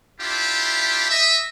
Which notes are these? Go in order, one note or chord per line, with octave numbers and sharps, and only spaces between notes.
D4 E4 F4 G4
D#5 E5